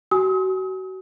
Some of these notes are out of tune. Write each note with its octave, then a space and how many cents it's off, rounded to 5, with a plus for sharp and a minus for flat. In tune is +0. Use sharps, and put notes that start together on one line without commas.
F#4 +30 G#5 +0 D#6 +40